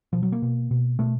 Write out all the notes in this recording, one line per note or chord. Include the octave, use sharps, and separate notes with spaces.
B2 F3
F#3
A#3
B2
B2
B2 A3